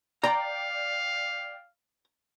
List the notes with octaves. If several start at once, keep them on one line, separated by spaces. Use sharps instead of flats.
D5 F5 G5 A#5